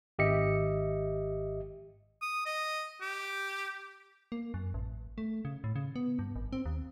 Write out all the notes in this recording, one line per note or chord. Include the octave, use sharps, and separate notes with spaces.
G#1 G4 D#5 E5 C#7
D#6
D#5
G4
A#3
F#2
A1
A3
C#3
A2
C#3
B3
G2
G#1
C4
D#2